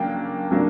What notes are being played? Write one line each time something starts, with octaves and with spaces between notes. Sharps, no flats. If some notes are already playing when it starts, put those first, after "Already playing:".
Already playing: C#3 F#3 A#3 D4 G5
C#3 F#3 A#3 D4